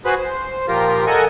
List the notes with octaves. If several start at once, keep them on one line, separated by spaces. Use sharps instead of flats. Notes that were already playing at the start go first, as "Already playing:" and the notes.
F#4 G#4 B4 C5 B5
C5
A#2 F3 F4 G4 A#4
A4 A#4 D#5 F#5 G#5